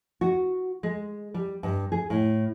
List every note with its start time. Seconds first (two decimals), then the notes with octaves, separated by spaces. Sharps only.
0.21 F#4
0.83 G#3
1.34 G3
1.63 G2
1.92 G#4
2.10 A2